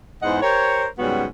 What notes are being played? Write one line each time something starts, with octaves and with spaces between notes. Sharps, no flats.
E2 G#2 E3 C5 D#5 F#5
G4 A#4 C5 C#5
G#2 C#3 F#3 G3 B3 F#4